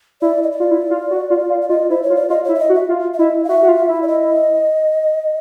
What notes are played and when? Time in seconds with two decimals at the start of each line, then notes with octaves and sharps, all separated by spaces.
0.22 E4 D5
0.43 D#5
0.51 D5
0.60 F4
0.71 E4
0.91 F4
1.11 F#4
1.30 F4
1.50 F4
1.62 D5
1.69 F4 D#5
1.90 E4 C5
2.03 C#5
2.10 F4
2.16 D5
2.29 F4 D#5
2.44 E4 C#5
2.55 E5
2.59 D#5
2.69 F#4
2.75 E5
2.89 F4
3.14 E5
3.19 E4 D#5
3.44 F5
3.49 F#4 E5
3.63 F#4
3.68 F4
3.89 E4
4.03 D5
4.08 D#5